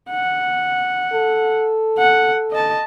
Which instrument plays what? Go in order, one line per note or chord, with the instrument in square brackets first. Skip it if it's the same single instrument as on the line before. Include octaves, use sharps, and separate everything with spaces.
[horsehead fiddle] F#5
[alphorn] A4
[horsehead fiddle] F#5
D#5 A5